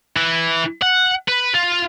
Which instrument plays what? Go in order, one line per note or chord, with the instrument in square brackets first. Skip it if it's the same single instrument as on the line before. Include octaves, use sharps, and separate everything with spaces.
[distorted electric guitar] E3
F#5
B4
F4